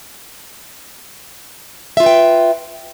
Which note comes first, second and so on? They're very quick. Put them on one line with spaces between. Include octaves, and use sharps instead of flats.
E5 F4 B4 G5